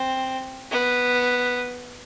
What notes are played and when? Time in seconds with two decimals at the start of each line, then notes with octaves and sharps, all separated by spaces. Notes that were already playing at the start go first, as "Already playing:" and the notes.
Already playing: C4
0.71 B3